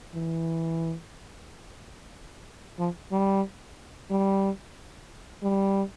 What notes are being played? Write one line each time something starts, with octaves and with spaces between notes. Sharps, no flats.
E3
F3
G3
G3
G3